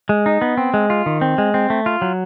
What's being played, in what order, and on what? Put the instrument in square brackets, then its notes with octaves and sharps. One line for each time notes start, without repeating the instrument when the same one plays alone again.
[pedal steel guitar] G#3
D#4
B3
C4
G#3
F4
D#3
C4
G#3
C4
A3
F4
F#3